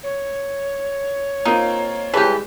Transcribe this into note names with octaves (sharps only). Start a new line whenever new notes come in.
C#5
A#3 C4 D#4 F4
E3 G3 G#3 G4 B4 A5